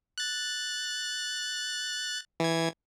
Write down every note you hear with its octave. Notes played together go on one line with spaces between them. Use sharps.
F#6 A6
E3 G#6